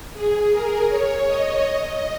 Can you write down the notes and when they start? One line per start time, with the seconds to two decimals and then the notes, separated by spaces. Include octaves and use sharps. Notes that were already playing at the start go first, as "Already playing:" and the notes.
0.13 G#4
0.52 A#4
0.89 C#5
1.27 D#5
1.65 D#5